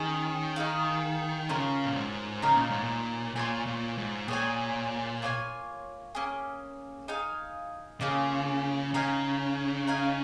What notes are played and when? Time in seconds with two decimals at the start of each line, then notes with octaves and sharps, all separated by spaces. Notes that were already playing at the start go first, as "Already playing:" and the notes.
Already playing: D#3 C#4 G#4 D#5
0.56 D#4 G#4 F5
1.49 C#3 C#4 F4 A#4
1.86 A#2
1.96 G#2
2.42 C#3 D#4 A#4 C#5 F5
2.56 A#2
2.70 G#2
2.84 A#2
3.35 A#2 F4 C#5 G#5
3.67 A#2
3.98 G#2
4.28 A#2 G#4 C#5 G#5
5.22 A#3 F4 C#5 G#5
6.15 A#3 C#4 G#4
7.08 D#4 G#4 F5 G#5
8.01 C#3 A#3 C#4 F4 G#4
8.94 C#3 D#4 C#5 F5 G#5
9.87 D#4 C#5 F5 G#5